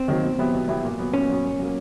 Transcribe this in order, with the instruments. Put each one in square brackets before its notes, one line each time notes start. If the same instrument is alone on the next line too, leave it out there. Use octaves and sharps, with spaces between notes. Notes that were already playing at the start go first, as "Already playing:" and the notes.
Already playing: [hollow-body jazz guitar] C4
[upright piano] D#3 F#3 A#3
B2
F#3 B3 E4 G4
B2
F#3 B3 E4 G4
A#2
F#3 B3
[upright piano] A#2 [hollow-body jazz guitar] C#4
[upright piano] F#3 B3
A#2
F#3 A#3